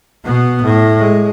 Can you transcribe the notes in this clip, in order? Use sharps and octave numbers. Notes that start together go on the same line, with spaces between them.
B2 B3
A2
G#3